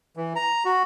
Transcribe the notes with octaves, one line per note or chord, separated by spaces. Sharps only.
E3
A#5
F#4